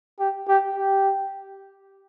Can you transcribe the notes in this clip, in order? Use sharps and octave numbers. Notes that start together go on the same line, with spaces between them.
G4
G4
G4